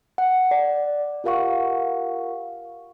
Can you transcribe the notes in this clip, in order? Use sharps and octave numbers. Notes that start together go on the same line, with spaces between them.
F#5
D5
F4 G4 A#4 F5 F#5 C#6